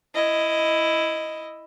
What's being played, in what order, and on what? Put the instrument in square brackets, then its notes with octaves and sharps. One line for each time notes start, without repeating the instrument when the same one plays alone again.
[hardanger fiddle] E4 D#5